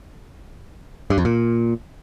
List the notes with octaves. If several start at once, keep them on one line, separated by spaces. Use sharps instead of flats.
G2
F2
A#2